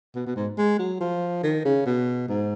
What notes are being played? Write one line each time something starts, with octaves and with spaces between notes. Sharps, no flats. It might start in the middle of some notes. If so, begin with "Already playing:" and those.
B2
B2
G#2
G#3
F#3
F3
D#3
C#3
B2
G#2